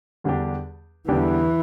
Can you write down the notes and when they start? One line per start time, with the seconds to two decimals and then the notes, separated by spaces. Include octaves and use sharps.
0.24 E2 D3 G3 D4 G4
1.08 E2 D3 E3 G3 D4 G4